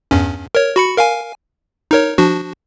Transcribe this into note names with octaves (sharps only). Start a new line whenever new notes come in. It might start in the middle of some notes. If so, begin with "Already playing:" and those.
E2 G2 C#4
A#4 C#5
F#4 B5 C#7
A#4 F5 G#5
D#4 A#4 C#5
F3 D4 F#4